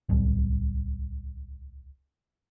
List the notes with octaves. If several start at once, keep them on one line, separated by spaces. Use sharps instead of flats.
D1 C2